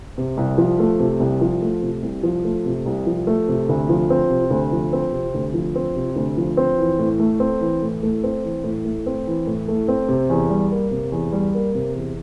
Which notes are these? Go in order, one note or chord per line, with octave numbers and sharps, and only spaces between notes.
C3
C2
F3
A3
C3
C2
F3
A3
C3
C2
F3
A3
C3
C2
F3
A3
C3
D2
F3
C4
C3
D2
F3
C4
C3
D2
F3
C4
C3
D2
F3
C4
E3
A2
A3
C4
E3
A2
A3
C4
E3
A2
A3
C4
E3
A2
A3
C4
C3
E2
G3
A#3
C3
E2
G3
A#3
C3
E2